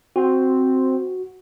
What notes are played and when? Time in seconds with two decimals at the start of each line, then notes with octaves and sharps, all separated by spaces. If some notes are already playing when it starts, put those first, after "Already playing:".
0.16 C4 F#4